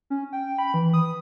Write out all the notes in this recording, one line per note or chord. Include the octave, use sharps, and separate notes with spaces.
C#4
G5
B5
E3
D#6